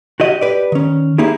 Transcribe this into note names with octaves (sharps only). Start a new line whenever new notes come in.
F#4 G4 D#5
G4 B4 D5
D#3 C#4
A#3 D#4 E4 G4 G#4